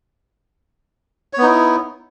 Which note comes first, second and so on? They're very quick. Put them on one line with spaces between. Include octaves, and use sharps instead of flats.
C#5 B3 D#4 E4